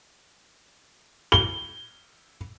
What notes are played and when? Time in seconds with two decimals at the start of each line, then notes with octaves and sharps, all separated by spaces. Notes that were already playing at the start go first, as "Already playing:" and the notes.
1.32 G7